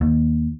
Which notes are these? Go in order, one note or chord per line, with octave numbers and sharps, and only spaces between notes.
D#2